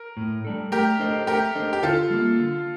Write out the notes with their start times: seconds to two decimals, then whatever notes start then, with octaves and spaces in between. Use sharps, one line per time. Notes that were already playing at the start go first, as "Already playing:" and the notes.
Already playing: A#4
0.17 A2
0.45 G3 D4 A4
0.72 A3 G4 A#4
1.00 D4 A4 C5 D#5
1.27 A3 G4 A#4
1.55 D4 A4 C5 D#5
1.73 G4
1.83 D3 F4 A4
2.10 G3 A#3
2.39 D3